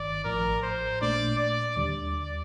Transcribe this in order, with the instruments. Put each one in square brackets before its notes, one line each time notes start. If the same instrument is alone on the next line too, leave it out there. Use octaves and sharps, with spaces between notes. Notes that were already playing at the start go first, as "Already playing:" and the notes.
Already playing: [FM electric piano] G1 G2 D#3 [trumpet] D5
[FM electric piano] A1 A2 F3 [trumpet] A#4
[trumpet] C5
[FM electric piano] A#2 A3 D4 [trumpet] D5
[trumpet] D5
[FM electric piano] D#2 D3 G3 [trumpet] D5